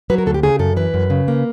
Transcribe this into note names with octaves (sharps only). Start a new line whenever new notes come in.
F#3 B4
A#4
D2 A4
G4
C#3 G#4
F#2 A4
E3 B4
F#2
C#3
A#3